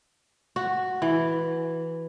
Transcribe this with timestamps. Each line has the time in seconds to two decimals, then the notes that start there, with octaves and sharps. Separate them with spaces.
0.56 F#4
1.02 E3